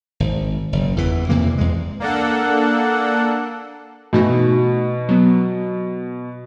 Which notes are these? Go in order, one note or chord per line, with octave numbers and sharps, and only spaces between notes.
G#1
F#1
E2 E3
E2 C3 E3 A#3
E2 G#3
A#3 D4 A4 F#5
B2 E3 A3 D#4
F#3 B3